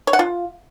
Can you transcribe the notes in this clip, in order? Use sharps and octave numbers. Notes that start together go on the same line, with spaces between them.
C#5
F#5
F4